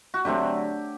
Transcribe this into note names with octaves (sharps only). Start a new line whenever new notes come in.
F#4
D3 F#3 A3 C4 G4